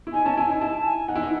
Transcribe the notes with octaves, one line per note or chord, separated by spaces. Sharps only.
E4
D#4 G#5
C#4 A5
E4 G#5
D#4
E4 A5
G#5
D#4 F#5
E4
D#4